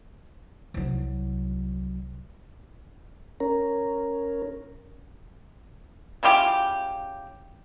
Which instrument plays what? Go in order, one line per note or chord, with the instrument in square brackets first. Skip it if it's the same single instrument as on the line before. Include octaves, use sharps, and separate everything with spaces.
[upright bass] C2 F#3
[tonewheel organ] C#4 A#4
[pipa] C#3 E4 F4 G4